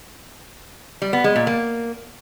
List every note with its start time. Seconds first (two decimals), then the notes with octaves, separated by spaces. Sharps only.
1.02 G3
1.13 B3
1.24 G#3
1.36 A#2
1.47 A#3